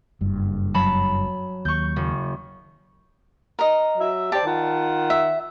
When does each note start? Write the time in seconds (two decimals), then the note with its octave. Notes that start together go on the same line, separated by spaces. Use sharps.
0.21 F#1 G2
0.74 F#3 A5 B5
1.65 D#2 C#6 G6
1.96 F#1
3.59 A#4 D#5
3.98 F#3 E5
4.32 G4 C5 D5 A5
4.44 D#3 F4 F#5
5.10 E5